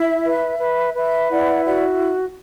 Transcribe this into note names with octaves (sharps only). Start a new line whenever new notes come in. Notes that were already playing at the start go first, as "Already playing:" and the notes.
Already playing: E4 E5
B4
B4
B4 E5
E4 D5 F#5
F#4 D5 F#5